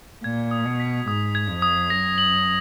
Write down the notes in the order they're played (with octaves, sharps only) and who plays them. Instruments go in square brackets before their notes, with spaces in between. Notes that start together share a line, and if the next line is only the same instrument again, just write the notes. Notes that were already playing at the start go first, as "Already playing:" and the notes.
[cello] A#2 [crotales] G#6
[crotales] D#6
[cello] B2
[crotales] B6
[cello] G#2 [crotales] D#6
[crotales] G#6
[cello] F2
[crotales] D#6
[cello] F#2 [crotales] A#6
[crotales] F#7